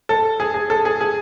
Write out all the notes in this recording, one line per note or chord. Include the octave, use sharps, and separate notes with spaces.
A4
G#4
G#4
A4
G#4
G#4